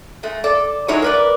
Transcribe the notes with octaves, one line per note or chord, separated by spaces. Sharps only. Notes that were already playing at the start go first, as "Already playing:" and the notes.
G#3 A3
A4 D5
F#3 G#3 D#4 E4 G#4 C#5
A#4 B4 D5